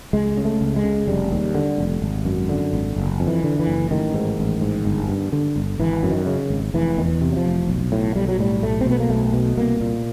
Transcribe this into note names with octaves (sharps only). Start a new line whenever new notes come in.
C#2 G#3
C#3
A3
C#2
G#3
C#3
F1 G3
D#2
D3
F1
G#1
F#2
D3
G#1
F#1
F2
E3
D3
E3
F#1
A1 D#3
G#2
A1
G#2
G1
G2
D3
G1
G#1 E3
F#2
D#3
C#3
G#1
F1 E3
E2 D#3
E3
C3
F#3
F3
F1
B1
A2
B1 G3
F#3
A2 G3
B1 A3
C4
B2 B3
A#3
B1 A3
B2
C2 A#3
A#2